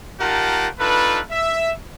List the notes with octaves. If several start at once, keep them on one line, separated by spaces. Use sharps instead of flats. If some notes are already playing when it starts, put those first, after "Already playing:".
D#4 F4 G4 A#4 F#5 A5
D4 D#4 F4 A4 B4
E5